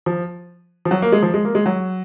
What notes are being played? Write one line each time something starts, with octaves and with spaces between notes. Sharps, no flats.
F3
F3
F#3
A#3
G#3
F3
G#3
A#3
G#3
F#3